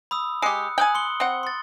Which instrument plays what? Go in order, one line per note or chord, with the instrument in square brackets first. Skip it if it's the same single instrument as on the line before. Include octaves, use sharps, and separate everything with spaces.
[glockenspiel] B5 D#6 E6
[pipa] G#3 G4 [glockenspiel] D#6 F#6 C#7
[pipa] G5 G#5 [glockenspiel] D#6 F#6 F#7
[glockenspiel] C6 C#7 G7
[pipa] C4 F#5
[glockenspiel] C6 A6